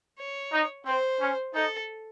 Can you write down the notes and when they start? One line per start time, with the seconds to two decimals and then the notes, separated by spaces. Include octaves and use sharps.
0.18 C#5
0.53 D#4
0.86 C4 C5
1.21 C#4
1.54 D#4 A4